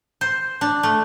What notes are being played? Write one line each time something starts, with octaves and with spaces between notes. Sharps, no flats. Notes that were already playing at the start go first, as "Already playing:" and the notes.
C5
D4
A3